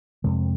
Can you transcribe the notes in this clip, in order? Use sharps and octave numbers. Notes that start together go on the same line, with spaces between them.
F2 C3 G#3